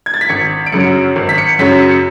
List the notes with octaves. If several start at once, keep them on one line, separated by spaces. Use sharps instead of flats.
G#6
A6
B6
G#1 C#7
D7
F#2 C#3 F#3 C#7
G#1
B6
C#7
F#2 C#3 F#3 B6
C#7